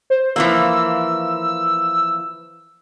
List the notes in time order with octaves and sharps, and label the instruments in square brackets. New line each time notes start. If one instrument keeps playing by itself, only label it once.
[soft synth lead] C5
[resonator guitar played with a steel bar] E3 F3 A#3 [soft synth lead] E6